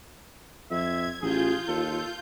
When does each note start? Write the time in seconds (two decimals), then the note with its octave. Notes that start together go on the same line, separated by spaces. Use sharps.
0.71 F2 E5 G#6
1.22 A1 F4 G#4 G6
1.68 D#2 A4